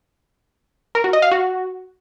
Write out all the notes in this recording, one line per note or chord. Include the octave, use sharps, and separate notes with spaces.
A#4
F#4
D#5
F5
F#4